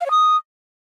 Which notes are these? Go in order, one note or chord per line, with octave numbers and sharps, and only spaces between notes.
F5
C#5
D#6